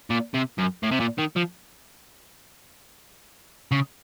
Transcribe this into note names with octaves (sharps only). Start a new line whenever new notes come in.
A#2
C3
F#2
A2
C3
A#2
D#3
F3
C#3